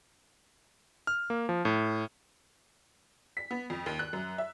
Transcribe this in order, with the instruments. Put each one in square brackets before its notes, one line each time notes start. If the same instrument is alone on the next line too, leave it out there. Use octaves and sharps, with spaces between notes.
[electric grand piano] F6
A#3
F3
A2
[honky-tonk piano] B6
B3
F2
D#2
F#6
F#2
E5